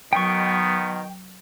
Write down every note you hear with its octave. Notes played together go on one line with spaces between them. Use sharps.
B2 D#3 F#3 B3 G5 C#6